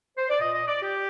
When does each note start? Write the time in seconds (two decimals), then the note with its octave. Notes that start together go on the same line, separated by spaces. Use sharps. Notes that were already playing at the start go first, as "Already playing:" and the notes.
0.18 C5
0.30 D5
0.40 A#2 D#5
0.54 D#5
0.68 D5
0.82 G4